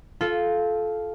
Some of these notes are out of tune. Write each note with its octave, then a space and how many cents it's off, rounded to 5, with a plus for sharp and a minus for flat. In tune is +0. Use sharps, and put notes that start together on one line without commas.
F4 +0 A4 -20